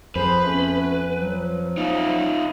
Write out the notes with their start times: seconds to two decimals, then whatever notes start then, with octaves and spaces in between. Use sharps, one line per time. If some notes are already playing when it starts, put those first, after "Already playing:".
0.16 F2 G#4 B4 C5
0.44 A3 B3 C#4
1.17 F3 F#3
1.77 D#4 F4